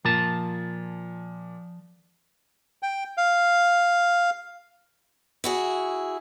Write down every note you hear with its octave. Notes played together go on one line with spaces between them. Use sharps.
A#2 F3 A5
G5
F5
E4 F#4 G#4